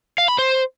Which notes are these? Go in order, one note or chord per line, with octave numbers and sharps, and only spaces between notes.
F5
B5
C5